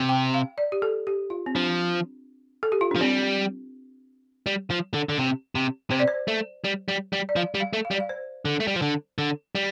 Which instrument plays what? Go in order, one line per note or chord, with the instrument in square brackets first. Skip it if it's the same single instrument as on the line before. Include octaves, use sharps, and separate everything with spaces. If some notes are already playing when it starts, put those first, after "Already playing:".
Already playing: [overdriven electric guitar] C3
[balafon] G5
F5
D5
G4
A4
G4
F4
C4
[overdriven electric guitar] F3 [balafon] D4
[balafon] A4
G4
F4
[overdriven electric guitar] F3 [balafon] D4
[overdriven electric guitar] G3 [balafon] C4
[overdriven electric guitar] G3
F3
D3
D3
C3
C3
[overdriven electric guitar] C3 [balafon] C5
[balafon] D5
C5
[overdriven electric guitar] A3
G3
G3
G3
[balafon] D5
[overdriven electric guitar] F3 [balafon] F5
[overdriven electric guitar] G3
[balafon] F5
[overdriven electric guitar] A3
[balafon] F5
[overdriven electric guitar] G3 [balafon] D5
[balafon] F5
C5
[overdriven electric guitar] D3
A3
G3
F3
D3
D3
G3